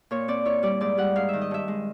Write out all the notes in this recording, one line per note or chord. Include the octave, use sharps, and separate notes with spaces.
A#2 C#5
C4 D5
E4 C#5
G3 D5
G#2 D5
G3 F#5
G#2 F5
D#3 E5
D#5
G2 E5
G#3